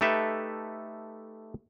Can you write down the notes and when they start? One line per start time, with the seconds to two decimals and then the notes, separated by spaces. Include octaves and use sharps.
0.01 A3 D#4 G4 A4 B4 E5